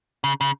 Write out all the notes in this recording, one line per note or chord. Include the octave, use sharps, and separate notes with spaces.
C#3
C#3